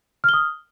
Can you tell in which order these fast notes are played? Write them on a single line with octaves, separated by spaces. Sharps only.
F6 G7 D#6